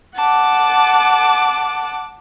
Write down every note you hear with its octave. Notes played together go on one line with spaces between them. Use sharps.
F#5 A5 D6